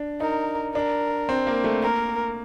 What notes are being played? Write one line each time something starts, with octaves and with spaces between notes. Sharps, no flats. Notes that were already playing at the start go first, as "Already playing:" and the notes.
Already playing: D4
D#4 A#4
D4 A#4
C4
A#3
A3
A#3 A#4